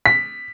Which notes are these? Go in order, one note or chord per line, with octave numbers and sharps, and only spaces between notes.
B6